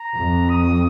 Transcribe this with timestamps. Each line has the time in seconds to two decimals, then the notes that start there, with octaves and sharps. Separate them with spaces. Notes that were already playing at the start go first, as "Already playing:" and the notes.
Already playing: A#5
0.15 F2
0.49 D#6